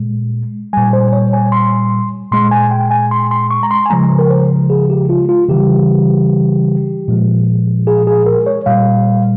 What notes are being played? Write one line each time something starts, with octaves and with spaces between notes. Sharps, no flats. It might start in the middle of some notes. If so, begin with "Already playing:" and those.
Already playing: A#2 G#3
A#2 G3 G#5
C5
C#5
G#5
C6
A#2 G#3 C6
G#5
G5
G#5
C6
C6
C#6
A#5
C6
G#5
C#3 F3 G#3 A#5
A#4
C5
G#4
G4
F4
F4
C#3 E3 G3 G4
A#2 F3 G#3
G#4
G#4
A#4
C#5
A#2 G3 F5